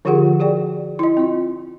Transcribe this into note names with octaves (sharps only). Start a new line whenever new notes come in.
D3 F3 F4 G4 G#4 F#5
F#4 G#4 D5 G5
E4 D#5
C4 F4